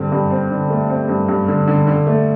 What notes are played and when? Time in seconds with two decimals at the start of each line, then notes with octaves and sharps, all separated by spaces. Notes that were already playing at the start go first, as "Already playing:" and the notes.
Already playing: G2 D3 C4
0.12 G2
0.31 C4
0.51 D3
0.70 A3
0.90 C4
1.09 G2
1.28 G2
1.48 D3
1.67 D3
1.87 D3
2.07 A3